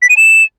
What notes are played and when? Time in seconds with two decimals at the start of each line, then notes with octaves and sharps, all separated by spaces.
0.02 B6
0.10 D#7
0.17 E7